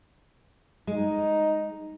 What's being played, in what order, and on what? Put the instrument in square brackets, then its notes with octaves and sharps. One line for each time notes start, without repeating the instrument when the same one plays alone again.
[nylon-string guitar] G#3 [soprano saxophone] D#4